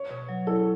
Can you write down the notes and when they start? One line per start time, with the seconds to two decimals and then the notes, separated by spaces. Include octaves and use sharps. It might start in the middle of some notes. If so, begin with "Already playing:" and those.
Already playing: C#5
0.10 B2
0.29 F#3
0.47 E4 A4